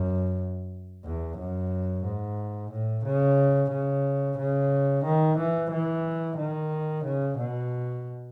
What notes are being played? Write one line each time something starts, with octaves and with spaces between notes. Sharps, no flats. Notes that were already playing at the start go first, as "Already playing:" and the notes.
Already playing: F#2
E2
F#2
G#2
A2
C#3
C#3
C#3
D#3
E3
E3
D#3
C#3
B2